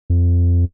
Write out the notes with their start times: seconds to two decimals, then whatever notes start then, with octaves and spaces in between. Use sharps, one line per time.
0.10 F2